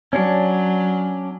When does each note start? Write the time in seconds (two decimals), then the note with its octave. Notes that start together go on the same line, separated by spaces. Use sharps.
0.13 F#3 C#4 D4